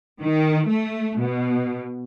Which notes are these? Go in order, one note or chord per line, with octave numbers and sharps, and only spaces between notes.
D#3
A3
B2